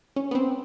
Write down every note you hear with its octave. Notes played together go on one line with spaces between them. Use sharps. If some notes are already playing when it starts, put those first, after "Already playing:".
C#4
B3
C4